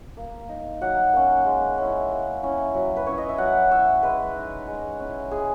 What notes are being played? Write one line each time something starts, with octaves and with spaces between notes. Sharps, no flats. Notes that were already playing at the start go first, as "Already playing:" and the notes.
A#3
D#4
F#3 F#5
A#3 C#4
G#3
C#4 E4
A#3
C#4 E4
F#3
B4
C#4 E4 C#5
D#5
E5
F#3 F#5
C#4 E4 E5
G#3 B4
D#4
G#3
C#4 E4
G#3 G#4